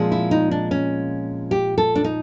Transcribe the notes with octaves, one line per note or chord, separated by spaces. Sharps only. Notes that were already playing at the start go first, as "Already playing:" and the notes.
Already playing: A#2 F3 G#3 C4
E4
D#4
D4
C#4
G4
A4
D4
D#4